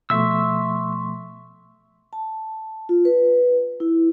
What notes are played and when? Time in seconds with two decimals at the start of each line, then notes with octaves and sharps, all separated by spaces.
0.10 B2 F3 A3 E5 C6 C#6 E6
2.13 A5
2.89 F4
3.05 B4
3.80 E4